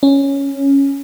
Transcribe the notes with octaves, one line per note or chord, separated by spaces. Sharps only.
C#4